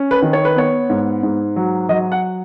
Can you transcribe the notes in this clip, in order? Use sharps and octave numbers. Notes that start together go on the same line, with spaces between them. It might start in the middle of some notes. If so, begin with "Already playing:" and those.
Already playing: C#4
B4
D#3
C#5
B4
B3 C#5
G#2
G#2
F#3
F#3 D#5
F#5